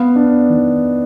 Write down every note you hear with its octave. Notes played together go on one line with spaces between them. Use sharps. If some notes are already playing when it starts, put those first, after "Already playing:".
Already playing: B3 F5
D4
D#3